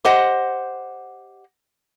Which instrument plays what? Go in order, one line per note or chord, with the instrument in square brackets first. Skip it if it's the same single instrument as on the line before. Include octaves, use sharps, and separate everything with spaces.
[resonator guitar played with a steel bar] G4 C5 D#5 F#5